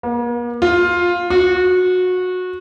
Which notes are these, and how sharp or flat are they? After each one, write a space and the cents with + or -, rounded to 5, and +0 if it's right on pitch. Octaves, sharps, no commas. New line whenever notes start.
A#3 +45
F4 +10
F#4 -20